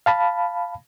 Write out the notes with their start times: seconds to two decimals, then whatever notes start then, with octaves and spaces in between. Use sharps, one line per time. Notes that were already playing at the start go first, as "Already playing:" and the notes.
0.06 F5 A5 B5